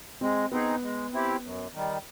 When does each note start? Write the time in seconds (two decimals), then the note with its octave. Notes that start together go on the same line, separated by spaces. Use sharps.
0.21 G#3 C4
0.52 B3 C4 D#4 G#4
0.83 G#3
1.13 C4 E4 G4
1.43 F#2
1.73 D#3 G3